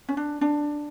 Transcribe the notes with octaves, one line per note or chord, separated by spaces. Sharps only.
C#4
D4
D4